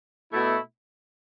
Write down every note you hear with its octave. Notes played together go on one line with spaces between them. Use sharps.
B2 A3 E4